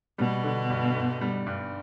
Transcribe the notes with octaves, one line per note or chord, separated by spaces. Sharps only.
B2 G3
D3
G2
G1
G3
G2